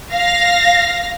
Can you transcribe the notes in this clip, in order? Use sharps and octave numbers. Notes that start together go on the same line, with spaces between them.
F5 A#6